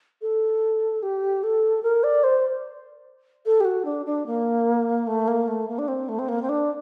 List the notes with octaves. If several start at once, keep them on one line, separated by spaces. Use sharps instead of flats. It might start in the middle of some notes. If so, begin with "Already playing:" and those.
A4
G4
A4
A#4
D5
C5
A4
G4
F#4
D4
D4
A#3
A3
A#3
A3
A#3
D4
C4
A3
C4
A#3
C4
D4